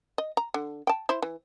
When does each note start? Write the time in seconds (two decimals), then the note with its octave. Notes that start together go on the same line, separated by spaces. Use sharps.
0.18 D#5
0.37 A#5
0.54 D3
0.87 G5 A5
1.09 E4 C5
1.22 E3